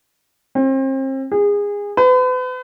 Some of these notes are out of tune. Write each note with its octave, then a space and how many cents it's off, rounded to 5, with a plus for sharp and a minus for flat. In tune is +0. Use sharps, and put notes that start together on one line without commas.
C4 +35
G#4 -25
B4 +40